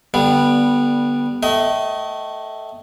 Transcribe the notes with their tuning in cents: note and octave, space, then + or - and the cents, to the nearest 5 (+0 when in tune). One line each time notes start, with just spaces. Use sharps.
D3 +0 G3 +5 B3 -15
A3 +0 D#5 +20 G5 -40